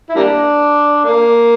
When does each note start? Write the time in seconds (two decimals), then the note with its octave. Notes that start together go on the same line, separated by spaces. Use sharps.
0.09 E4
0.16 G3 A#3 D4
1.05 A#3